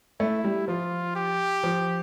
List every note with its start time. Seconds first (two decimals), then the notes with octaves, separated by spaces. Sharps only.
0.20 A3 E4
0.44 G3
0.68 F3 F4
1.16 G4
1.64 F3